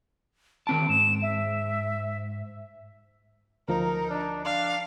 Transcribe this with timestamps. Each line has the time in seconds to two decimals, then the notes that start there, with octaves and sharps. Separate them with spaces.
0.67 D#3 C4 A5 D7
0.89 G#2 E7
1.22 E5
3.68 D2 F3 D#4 A#4
4.10 D4
4.45 D4 F5